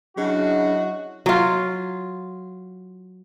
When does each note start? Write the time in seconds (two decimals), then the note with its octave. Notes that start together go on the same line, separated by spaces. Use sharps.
0.18 C#3 F#3 D4 E4 F#4 D#5
1.26 F#3 F4